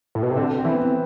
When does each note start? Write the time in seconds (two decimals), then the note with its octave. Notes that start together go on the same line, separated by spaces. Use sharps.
0.15 A2
0.23 B2
0.31 C3
0.37 D3 C4
0.58 C4
0.65 E3
0.73 B3
0.78 C4